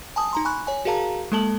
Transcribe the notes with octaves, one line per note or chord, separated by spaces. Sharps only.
G#5 A5 D#6
D#4 A#5 C6
G#5 B5 C#6 F#6
C#5 G#5
F#4 G#4 A#4 F5 A5 A#5
G#3 A#3 A4 A5 F#7